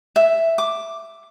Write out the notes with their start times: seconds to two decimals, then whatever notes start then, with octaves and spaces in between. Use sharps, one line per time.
0.16 E5
0.58 D6